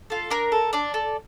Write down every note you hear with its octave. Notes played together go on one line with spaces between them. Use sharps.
F4 A4
D4 A#4
A4
D4 D5
A4